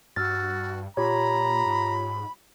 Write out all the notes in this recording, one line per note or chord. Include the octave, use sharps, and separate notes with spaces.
G2 F#4 E6 F6 A6
A#2 F4 G4 C#5 A#5 B5
G#2